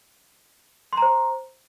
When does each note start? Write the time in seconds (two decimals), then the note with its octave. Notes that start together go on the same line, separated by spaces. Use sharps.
0.93 C6
0.97 A#5
1.02 C5